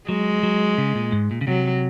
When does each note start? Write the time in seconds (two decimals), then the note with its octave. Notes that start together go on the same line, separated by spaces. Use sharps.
0.08 F#3 G#3
0.43 F#3
0.78 C#3
0.95 A#2
1.12 G#2
1.31 A#2
1.41 C#3
1.47 C3 F#3